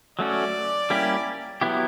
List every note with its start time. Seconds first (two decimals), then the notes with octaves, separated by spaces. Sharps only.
0.19 F#3 A3 C#4 F#4 D5
0.90 G3 A#3 C#4 E4 G4
1.61 F#3 B3 E4 G4